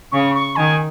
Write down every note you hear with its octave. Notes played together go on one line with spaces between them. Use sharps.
C#3 C#6
C#6
D#3 G#5